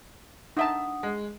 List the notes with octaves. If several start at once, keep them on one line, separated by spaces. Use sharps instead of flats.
D4 D#4 E5 F#5 A5 D#6
G#3